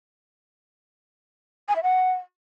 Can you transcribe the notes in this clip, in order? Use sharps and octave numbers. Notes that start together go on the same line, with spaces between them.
G#5
E5
F#5